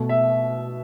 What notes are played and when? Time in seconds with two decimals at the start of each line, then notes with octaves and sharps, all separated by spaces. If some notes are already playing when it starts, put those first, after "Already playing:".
Already playing: B2 A3
0.09 E5